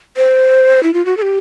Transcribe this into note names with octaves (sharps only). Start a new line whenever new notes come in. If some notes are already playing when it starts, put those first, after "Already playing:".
C5
E4
F4
F#4
A4
G4